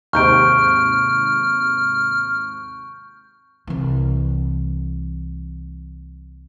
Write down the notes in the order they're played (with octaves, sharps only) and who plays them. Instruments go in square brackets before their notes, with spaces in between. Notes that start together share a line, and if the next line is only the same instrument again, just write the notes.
[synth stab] D#2 G#2 C3 [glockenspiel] C#6 G6 D7 [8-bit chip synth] F6
[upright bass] C2 E3